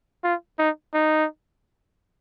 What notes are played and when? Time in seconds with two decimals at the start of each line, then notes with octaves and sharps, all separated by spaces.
0.24 F4
0.59 D#4
0.94 D#4